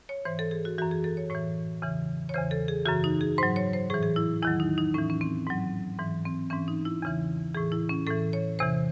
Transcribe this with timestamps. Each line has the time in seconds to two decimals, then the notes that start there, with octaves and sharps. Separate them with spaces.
0.09 C#5
0.25 G#2 E3 C5
0.39 A4
0.51 G#4
0.65 F#4
0.78 F#2 E3 F#4
0.91 G#4
1.04 A4
1.17 C#5
1.30 A2 E3 C#5
1.82 E2 C#3 E3
2.29 C#5
2.34 E2 C#3 E3 C5
2.51 A4
2.68 G#4
2.86 F#2 C#3 E3 F#4
3.04 D#4
3.21 G#4
3.38 G#2 F#3 C5
3.56 C#5
3.73 C5
3.90 A2 E3 G#4
4.03 G#4
4.16 E4
4.42 E2 D#3 F#3 E4
4.60 D#4
4.78 D#4
4.94 A2 E3 C#4
5.10 C#4
5.21 C4
5.47 G#2 F#3
5.98 G#2 E3
6.25 C4
6.50 G#2 E3 C#4
6.68 D#4
6.85 E4
7.02 E2 C#3 E3
7.55 A2 E3 G#4
7.72 E4
7.89 C#4
8.07 A2 E3 A4
8.33 C#5
8.59 E2 C3 E3 C5